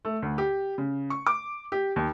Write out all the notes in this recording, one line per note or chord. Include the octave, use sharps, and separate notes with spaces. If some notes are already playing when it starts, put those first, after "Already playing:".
A3
D2
G4
C#3
C#6
D6
G4
D#2